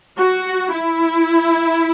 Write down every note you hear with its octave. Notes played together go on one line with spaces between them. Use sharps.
F#4
E4